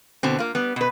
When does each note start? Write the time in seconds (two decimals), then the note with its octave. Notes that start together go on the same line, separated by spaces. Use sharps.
0.23 B2 D3 C4
0.39 A#3 F4
0.55 G3 B3
0.76 B2 B4